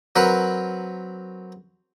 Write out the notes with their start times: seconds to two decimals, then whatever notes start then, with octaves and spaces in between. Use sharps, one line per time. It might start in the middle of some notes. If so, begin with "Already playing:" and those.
0.16 F#3 C4 A#4 B4